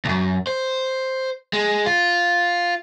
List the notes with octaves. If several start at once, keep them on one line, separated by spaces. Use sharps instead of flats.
C2 F#2
C5
G#3
F4